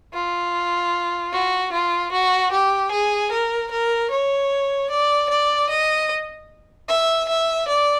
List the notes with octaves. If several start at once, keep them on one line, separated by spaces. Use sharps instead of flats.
F4
F#4
F4
F#4
G4
G#4
A#4
A#4
C#5
D5
D5
D#5
E5
E5
D5